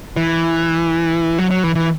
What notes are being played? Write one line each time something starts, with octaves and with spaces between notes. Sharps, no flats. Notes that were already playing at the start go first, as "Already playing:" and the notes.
E3
F#3
F#3
E3
E3